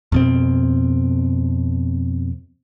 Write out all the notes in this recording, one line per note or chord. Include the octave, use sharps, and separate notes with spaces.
F2 B2 C4